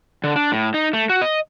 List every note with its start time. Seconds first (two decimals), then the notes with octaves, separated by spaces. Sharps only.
0.24 D3
0.36 D4
0.52 A2
0.74 D#4
0.93 A3
1.09 F#4
1.21 D#5